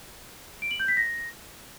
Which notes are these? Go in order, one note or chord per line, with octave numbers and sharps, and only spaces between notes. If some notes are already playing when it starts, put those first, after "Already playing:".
D7
F#7
G6
B6
A#6